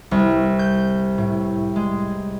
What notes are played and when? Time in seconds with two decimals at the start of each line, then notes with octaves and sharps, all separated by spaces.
0.11 C2
0.59 G6
1.18 A2
1.76 G#3